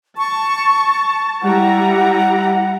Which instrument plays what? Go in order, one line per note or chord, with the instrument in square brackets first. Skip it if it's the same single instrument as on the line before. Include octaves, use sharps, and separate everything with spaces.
[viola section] A5 [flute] C#6
[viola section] G3 E4 A#5 [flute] F#5